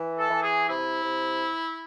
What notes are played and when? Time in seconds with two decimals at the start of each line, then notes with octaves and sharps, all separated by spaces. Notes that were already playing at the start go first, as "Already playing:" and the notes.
Already playing: E3
0.17 A4
0.30 E3
0.42 G#4
0.66 C3 E4
1.02 C3